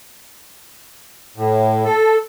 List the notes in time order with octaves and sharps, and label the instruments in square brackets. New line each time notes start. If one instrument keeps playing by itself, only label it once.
[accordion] A2
A4